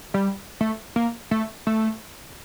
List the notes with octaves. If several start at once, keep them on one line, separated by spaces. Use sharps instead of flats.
G3
A3
A#3
A3
A3